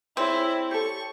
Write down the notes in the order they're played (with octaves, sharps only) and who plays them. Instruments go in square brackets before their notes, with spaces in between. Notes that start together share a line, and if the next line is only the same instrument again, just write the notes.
[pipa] C4 [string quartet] E4 [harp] G#4 C#5 D5
[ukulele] G4 A4 [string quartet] C#6